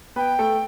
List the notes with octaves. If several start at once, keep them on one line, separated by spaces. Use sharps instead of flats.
B3 B4 G5
A3 A4